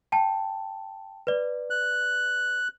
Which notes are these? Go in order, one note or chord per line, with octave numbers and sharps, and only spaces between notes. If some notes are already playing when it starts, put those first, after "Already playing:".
G5 A5
B4 D5
F#6